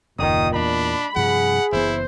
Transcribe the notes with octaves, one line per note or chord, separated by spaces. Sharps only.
F#1 D#2 A#2 D#3 D#6
E2 D4 B5
G2 C3 F3 G#4 F#5
F#1 E3 B3 E4 C5